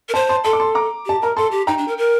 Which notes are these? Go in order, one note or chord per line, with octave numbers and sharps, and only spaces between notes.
A#4
C5 A5 C6
A5 C6
A4 A5 C6
D6
A5 C6
A#5 D6
G4 A5
A#4 A#5
A4 A5 C6
G4
D#4 G5 A#5
D4
A#4
A#4